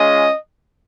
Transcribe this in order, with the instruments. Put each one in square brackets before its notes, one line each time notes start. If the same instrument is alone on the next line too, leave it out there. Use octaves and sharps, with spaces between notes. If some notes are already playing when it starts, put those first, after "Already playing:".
Already playing: [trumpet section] G#3 C#4 F4 D#5